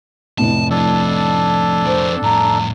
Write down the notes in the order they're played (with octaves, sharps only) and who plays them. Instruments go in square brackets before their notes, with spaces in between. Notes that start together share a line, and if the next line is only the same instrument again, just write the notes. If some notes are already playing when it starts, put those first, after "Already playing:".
[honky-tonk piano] F1 A2 [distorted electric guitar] A5
[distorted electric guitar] F3 D#5 [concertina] D4 A4
[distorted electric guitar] F2 A#4 [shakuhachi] C5
[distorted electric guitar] F2 A2 [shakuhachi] A#5